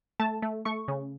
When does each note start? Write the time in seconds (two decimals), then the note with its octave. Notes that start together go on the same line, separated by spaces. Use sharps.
0.20 A3 A5
0.42 A3
0.65 A3 C#6
0.88 C#3